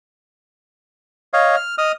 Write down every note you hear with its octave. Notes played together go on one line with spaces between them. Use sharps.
C#5 D#5 F5
F6
D#5 D#6 F6